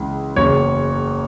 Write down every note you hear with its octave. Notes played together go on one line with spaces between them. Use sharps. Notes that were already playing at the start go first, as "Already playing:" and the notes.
Already playing: C#2 C#3 E3
F#1 E2 C#3 F#3 C#5